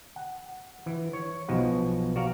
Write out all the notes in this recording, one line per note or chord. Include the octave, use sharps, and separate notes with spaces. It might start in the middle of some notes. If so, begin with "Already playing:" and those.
F#5
E3
C#5
B1 B2 F3 D#4 F#5
F#4 D5 F5 A#5